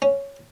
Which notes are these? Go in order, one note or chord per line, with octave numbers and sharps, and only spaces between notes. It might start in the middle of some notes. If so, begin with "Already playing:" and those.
C#4